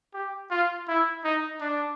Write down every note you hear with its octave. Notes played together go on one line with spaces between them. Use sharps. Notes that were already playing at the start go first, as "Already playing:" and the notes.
G4
F4
E4
D#4
D4